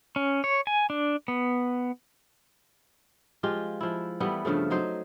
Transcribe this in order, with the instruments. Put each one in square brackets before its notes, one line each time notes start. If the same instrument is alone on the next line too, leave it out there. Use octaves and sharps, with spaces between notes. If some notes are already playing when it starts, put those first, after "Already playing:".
[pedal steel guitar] C#4
C#5
G#5
D4
B3
[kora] F3 G#3 F4 G4
F3 E4
E3 G3 A3 B3
G2 C#3 F3 A3
F#3 D#4 C5